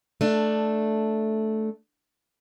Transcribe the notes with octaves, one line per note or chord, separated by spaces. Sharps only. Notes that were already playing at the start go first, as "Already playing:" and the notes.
A3 D4